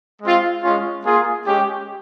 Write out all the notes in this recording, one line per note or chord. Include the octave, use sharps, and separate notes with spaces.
G#3 C4 F4
G#3 C#4 F4
A#3 F4 G#4
G#3 C#4 G4